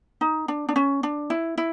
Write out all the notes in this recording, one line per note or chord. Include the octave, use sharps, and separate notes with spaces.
D#4
D4
D4
C#4
D4
E4
E4